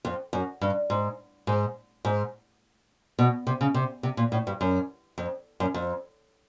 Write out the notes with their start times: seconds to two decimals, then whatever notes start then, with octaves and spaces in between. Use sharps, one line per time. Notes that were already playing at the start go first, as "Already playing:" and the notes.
0.05 F2
0.33 F#2
0.61 G2
0.90 G#2
1.47 G#2
2.05 G#2
3.19 B2
3.47 C3
3.61 C#3
3.74 C3
4.03 C3
4.17 A#2
4.32 A2
4.47 G2
4.61 F#2
5.18 F2
5.60 F#2
5.74 F2